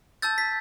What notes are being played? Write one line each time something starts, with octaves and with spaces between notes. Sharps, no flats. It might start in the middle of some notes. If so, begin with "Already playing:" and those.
A5 E6 G6 A6
B6